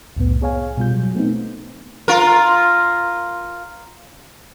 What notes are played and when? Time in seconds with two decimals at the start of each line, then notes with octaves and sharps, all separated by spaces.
0.16 C2 F2 A2 B3
0.41 B3 G#4 C#5 F5 G#5
0.77 B2 G3 F4 G6
0.94 F#3
1.15 A3 B3 C4 D#4
2.08 F4 A#4